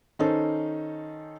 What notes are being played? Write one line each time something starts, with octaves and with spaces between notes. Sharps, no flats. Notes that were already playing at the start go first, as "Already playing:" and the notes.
D#3 C#4 D#4 A4 C5